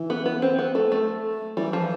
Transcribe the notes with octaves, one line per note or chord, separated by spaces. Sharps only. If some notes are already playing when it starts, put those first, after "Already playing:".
Already playing: E3
B3
B3
C4
B3
A3
A3
E3 G3
F3